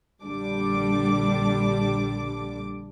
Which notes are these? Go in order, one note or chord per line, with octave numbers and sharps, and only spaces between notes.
A#1 D3 G3 D4 D6